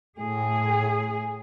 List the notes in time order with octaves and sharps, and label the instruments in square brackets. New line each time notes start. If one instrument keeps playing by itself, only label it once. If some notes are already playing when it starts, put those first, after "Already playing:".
[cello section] A2 G#4